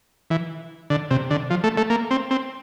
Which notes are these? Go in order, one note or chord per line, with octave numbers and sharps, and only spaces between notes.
E3
D3
C3
D3
F3
A3
A3
A#3
C4
C4